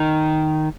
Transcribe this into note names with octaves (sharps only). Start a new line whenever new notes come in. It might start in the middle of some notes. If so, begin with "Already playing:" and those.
Already playing: D#3